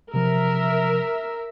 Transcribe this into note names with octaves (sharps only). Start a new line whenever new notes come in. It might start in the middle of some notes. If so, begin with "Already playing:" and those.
C3 F3 A#4 E5